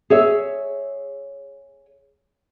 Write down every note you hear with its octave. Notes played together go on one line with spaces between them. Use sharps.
G#4 C#5 E5